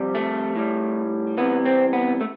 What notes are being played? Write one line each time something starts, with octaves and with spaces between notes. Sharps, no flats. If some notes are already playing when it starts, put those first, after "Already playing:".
Already playing: F2 C3 G3
A3
A2 G3
C2 C3 E3 B3
C4
B3
A3